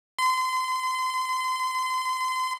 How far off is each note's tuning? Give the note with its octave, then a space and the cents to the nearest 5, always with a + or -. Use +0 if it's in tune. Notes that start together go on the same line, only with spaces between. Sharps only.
C6 -30